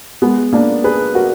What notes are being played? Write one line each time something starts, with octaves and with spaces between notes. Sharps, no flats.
G#3 B3
A#3 D4
G#4 B4
F#4 A#4